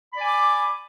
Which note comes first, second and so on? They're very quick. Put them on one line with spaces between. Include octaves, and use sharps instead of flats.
B5 D5 G#5 D6